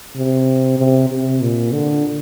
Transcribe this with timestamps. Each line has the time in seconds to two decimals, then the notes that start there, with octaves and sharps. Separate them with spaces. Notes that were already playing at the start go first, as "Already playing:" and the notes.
0.16 C3
0.79 C3
1.10 C3
1.41 A#2
1.72 D3